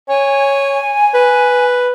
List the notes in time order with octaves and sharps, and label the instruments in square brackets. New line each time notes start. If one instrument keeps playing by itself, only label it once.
[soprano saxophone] C#5 [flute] G#5
[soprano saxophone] B4